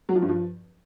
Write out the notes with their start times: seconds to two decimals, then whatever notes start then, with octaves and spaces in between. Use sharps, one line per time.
0.09 F#3
0.15 F3
0.22 G2
0.29 F3